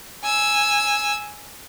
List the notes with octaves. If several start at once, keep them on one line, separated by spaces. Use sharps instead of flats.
G#5 E6